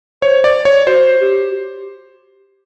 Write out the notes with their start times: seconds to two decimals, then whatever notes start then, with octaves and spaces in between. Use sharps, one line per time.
0.22 C5 C#5
0.44 D5
0.65 C#5
0.86 F#4 C5
1.20 G4